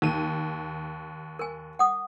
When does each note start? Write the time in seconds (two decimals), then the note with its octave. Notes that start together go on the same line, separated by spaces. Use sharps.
0.02 D#2 D#7
1.39 A#4 G#5
1.79 F#5 D#6